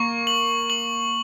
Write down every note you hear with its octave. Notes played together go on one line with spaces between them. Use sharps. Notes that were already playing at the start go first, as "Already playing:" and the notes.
Already playing: A#3 C#6
F#7
F#7